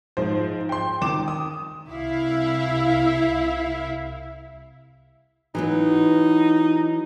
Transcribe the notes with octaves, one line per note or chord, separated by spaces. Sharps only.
G#2 F3 C5
G5 C6
D#3 D6 E7
D#6
C2 E4 E5 F5
E3 F#3 B3 D#4